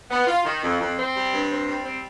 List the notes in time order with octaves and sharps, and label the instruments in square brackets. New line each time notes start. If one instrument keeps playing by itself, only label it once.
[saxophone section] B3
F4
D#3
F2
F2
C4
G3
G2
C4
G3
C4